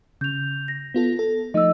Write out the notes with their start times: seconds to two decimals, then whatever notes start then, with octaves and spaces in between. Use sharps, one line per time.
0.21 C#3 G6 F7
0.68 A#6
0.94 B3 F4 A4
1.19 A4
1.54 F3 A3 D#4 D#5 E6